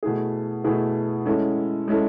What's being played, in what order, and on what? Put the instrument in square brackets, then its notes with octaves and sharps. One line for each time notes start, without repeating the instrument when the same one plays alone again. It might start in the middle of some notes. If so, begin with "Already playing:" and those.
[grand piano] B2 A3 E4 G#4
B2 A3 E4 G#4
G#3 C#4 E4 A4
G#3 C#4 E4 A4